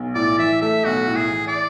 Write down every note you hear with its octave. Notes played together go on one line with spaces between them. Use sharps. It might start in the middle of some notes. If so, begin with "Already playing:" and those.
Already playing: B1
A2 D5
E3 E5
A3 E5
B1 F#4
A2
G#4
E3
D5